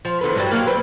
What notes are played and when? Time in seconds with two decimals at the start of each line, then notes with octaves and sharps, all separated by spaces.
0.05 F3
0.21 E2 D3 B4
0.35 G2 F#3 G3
0.51 F#3 A#3
0.67 C4 B4